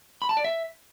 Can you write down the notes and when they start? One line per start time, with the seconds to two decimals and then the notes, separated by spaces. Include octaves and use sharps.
0.22 B5
0.29 A5
0.37 D5
0.44 E5